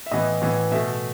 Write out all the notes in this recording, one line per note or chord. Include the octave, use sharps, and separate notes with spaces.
E5
A2 E3 B3 D#5
A2 E3 B3
B2 A3 E5